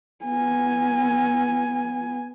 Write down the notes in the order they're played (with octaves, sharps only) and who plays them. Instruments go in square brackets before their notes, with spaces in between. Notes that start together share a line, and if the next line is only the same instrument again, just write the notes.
[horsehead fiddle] B3 G#5